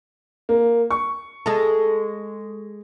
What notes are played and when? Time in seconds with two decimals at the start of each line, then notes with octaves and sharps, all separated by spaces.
0.49 A#3
0.90 C#6
1.46 G#3 A4